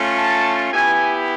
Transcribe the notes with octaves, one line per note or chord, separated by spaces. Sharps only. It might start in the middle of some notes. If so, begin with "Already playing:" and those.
Already playing: A3 C#4 F4
A5
B3 E4 G4 G#5